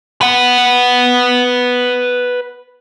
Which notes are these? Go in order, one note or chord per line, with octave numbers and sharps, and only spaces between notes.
B4 F#5